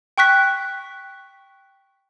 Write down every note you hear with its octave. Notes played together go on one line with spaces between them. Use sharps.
G5 C#6 F#6 B6